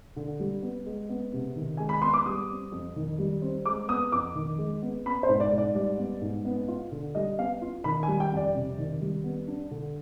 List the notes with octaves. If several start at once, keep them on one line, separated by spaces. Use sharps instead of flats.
D3
G3
B3
G#3
B3
C3
D#3
G#3 G#5
B5
B3 C6
D6
G3 D#6
C4
F2
D#3
G3
C4
G#3 D6
B3 D#6
F2 D6
D#3
G#3
B3
B3 B5
C5
G#2
D5
G#2
D5
G3 D5
B3
G#2
B3
F4
D3
G3 D#5
B3 F5
F4
D#3 B5
G#5
G3
G5
F2 D5
C3
D#3
G3
B3
D4
D3